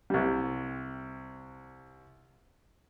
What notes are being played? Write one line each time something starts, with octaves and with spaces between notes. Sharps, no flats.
C2 G3